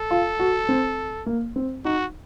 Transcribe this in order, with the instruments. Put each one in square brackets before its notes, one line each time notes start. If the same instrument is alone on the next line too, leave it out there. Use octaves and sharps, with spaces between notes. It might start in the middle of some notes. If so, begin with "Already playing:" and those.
Already playing: [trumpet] A4
[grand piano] F4
F#4
C4
A#3
C4
[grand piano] D#4 [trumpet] F#4